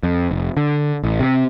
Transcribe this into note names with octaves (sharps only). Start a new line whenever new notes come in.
F2
F1
D3
A1
C3